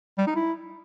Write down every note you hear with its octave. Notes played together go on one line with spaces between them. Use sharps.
G3
D#4
E4